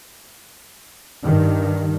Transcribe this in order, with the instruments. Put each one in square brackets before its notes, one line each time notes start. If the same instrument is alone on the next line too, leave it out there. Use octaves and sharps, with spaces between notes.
[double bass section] G2 D#3